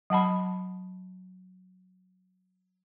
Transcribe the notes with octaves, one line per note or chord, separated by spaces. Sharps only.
F#3 F#5 A5 B5